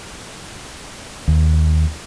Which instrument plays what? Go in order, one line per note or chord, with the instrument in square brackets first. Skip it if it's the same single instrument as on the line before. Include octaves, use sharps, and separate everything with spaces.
[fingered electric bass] D#2